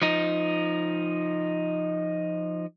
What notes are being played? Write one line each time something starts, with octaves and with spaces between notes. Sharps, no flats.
F3 D#4